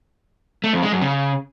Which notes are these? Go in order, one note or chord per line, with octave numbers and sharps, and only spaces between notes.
A3
F2
G#3
F#2
C#3